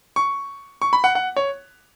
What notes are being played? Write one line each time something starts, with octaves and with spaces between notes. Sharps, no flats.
C#6
C#6
B5
F#5
F#5
C#5